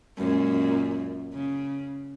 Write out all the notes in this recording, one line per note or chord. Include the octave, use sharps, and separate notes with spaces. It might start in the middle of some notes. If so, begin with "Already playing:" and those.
F#2 A#2 G#3
C#3